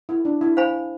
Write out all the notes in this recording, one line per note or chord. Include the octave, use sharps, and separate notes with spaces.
E4
D4
E4
C5 F5 G#5 B5